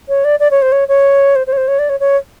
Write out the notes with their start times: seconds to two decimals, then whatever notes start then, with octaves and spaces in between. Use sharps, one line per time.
0.09 C#5
0.24 D5
0.40 D5
0.51 C#5
0.62 C5
0.72 C#5
0.88 C#5
1.36 C5
1.47 C5
1.53 C#5
1.57 C5
1.68 C#5
1.79 D5
1.89 C#5
2.00 C#5